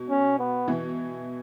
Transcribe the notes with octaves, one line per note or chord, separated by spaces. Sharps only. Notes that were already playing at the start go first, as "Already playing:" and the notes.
Already playing: B2
C#4
B3
B2 E3